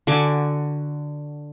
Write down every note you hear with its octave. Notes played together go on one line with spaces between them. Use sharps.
D3 F#4 G#5 D6